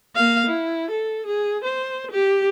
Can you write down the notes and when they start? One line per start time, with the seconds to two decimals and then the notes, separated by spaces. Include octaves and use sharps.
0.15 A#3 F5
0.46 E4
0.90 A4
1.26 G#4
1.64 C5
2.11 G4